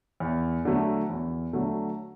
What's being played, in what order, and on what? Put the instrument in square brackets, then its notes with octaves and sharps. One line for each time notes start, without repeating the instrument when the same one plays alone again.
[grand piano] E2
D3 F#3 A3
E2
D3 F#3 A3